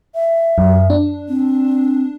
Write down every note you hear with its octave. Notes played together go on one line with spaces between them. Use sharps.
E5
F#2
D4
C4